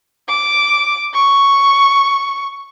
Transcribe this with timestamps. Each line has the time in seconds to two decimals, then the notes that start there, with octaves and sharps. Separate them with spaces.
0.29 D6
1.14 C#6